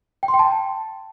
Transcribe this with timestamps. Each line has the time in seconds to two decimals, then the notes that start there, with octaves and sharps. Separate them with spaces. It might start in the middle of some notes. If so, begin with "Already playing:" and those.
0.23 G5
0.28 C6
0.34 G5
0.39 A5